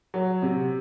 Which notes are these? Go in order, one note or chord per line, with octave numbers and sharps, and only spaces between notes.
F#3
C3